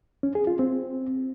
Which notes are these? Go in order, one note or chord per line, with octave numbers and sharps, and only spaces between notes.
C#4
G#4
F4
C4